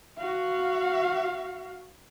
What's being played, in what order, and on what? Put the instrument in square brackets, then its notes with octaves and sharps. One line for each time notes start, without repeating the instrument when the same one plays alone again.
[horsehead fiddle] F#4 F5